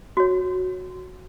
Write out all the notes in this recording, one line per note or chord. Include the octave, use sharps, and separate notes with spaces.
F#4 C#5